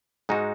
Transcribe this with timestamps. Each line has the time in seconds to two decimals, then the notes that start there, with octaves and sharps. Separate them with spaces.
0.29 G#2 G#3 D#4 F#4